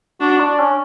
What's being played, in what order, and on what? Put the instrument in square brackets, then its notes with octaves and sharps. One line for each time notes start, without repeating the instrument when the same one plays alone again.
[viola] D4 [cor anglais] F#4
[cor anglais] D4
C#4